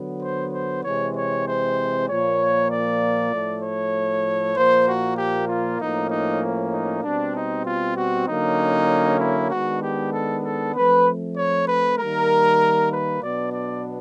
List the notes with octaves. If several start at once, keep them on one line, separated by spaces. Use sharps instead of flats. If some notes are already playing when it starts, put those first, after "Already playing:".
Already playing: D3 F#3 B3
C5
C5
C3 E3 G#3 C4 C#5
C#5
C5
A#2 F3 A#3 C#5
D5
A2 F3 A3
C#5
A#2 F3 A#3 C5
F#4
G4
F4
A2 F3 A#3 C#4 D#4
D#4
D#4
B2 G3 C4 D4
D#4
F4
F#4
D3 F#3 A#3 C#4 D#4
E4
D#3 G#3 B3 D4 F#4
G4
A4
A4
F3 A3 C4 B4
C#5
B4
D#3 G3 A#3 A#4
B4
B2 F#3 B3 D4 D5
D5